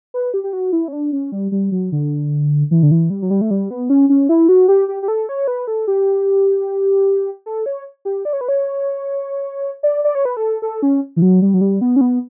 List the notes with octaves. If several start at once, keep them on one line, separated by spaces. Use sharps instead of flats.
B4
G4
G4
F#4
E4
C#4
D4
C#4
G3
G3
F#3
D3
E3
D3
E3
G3
F#3
G3
A3
G3
B3
C#4
C#4
E4
F#4
G4
G4
G4
A4
C#5
B4
A4
G4
A4
C#5
G4
D5
C#5
B4
C#5
D5
D5
C#5
B4
A4
A4
C#4
E3
F#3
G3
F#3
G3
B3
C#4
B3